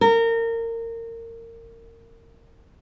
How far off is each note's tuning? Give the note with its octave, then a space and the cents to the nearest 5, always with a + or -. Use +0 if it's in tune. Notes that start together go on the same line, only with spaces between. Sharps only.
A#4 -25